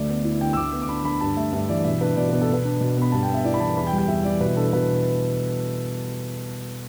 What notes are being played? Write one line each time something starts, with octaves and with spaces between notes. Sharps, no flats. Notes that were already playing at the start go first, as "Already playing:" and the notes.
Already playing: D2 A3 D5
B3
E4
D3 G5
E6
D2 D6
B3
D6
D4 B5
D3 B5
G2 A5
A3 E5
G2 E5
E3 D5
B2 E5
D4 B4
B2 D5
B3 B4
A4
B2 B4
D4
B2
B3 B5
G2 A5
G5
B3
E5
E4 D5
B5
E3 A5
E2 B5
G5
G3
G5
E2 E5
E3 D5
B2 B4
D4 A4
B2 B4